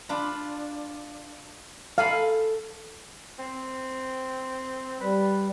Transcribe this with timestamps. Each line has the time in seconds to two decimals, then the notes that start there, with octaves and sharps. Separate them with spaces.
0.09 D4 F4 B5
1.98 A4 F5 G#5 B5
3.39 C4
5.00 G3 B4